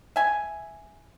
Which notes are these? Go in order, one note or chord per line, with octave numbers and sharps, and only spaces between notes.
E5 G#5